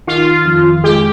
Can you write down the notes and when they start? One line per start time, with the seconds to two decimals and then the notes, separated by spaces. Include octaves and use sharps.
0.07 D#3 F4
0.46 F2
0.84 G#3 G4